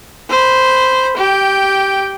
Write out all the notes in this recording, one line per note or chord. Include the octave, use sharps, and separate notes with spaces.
C5 B5
G4 G5